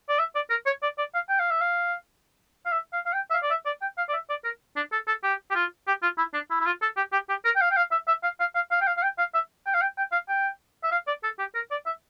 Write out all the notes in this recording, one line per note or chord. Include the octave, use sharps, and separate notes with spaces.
D5
E5
D5
A#4
C#5
D5
D5
F5
G5
F5
E5
F5
F5
E5
F5
F5
G5
E5
F5
D5
E5
D5
G5
F5
D5
E5
D5
A#4
D4
A4
A4
G4
G4
F4
G4
F4
E4
D4
E4
E4
F4
A4
G4
G4
G4
A#4
G5
F5
G5
F5
E5
E5
F5
F5
F5
F5
G5
F5
F5
G5
F5
E5
G5
F5
G5
G5
F5
G5
E5
F5
D5
A4
G4
A#4
D5
E5